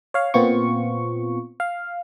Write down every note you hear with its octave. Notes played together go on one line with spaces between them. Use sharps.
C#5 F5
A#2 B3 C4 F4 C#6
F5